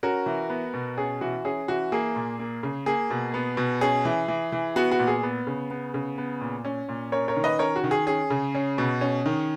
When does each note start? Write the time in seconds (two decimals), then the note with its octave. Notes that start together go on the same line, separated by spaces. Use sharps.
0.03 C#4 F#4 A#4
0.26 E3
0.50 B3
0.74 B2
0.97 C#4 G#4
1.21 E3 F#4
1.45 C#4 G#4
1.68 E3 F#4
1.92 A#3 G#4
2.16 A#2
2.39 A#3
2.63 C#3
2.86 A#3 G#4
3.11 B2
3.34 B3
3.57 B2
3.81 C#4 G#4
4.05 E3
4.28 E3
4.52 E3
4.76 B3 F#4
4.91 F#4
5.00 A#2
5.07 G#4
5.23 B3
5.47 C#3
5.71 B3
5.94 C#3
6.18 B3
6.41 A#2
6.65 C#4
6.89 A#2
7.12 C#4 A#4 C#5
7.28 A#4 C#5
7.36 D#3
7.44 B4 D#5
7.59 C#4 A#4 C#5
7.76 F#4
7.84 D#3
7.91 G#4
8.07 C#4 G#4
8.30 C#3
8.55 C#4
8.78 B2
9.01 C#4
9.26 D#3